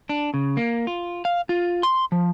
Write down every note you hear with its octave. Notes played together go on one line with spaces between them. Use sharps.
D4
C#3
A#3
F4
F5
F4
C6
F3